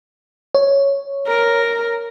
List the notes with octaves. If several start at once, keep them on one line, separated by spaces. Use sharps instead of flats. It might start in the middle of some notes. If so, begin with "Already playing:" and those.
C#5
A#4